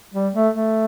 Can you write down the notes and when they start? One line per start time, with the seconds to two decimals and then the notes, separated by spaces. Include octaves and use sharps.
0.14 G3
0.35 A3
0.54 A3